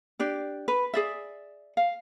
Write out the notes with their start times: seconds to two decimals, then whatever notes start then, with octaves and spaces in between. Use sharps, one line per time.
0.19 D4 G4 D5
0.68 B4
0.94 G#4 D5 E5
1.77 F5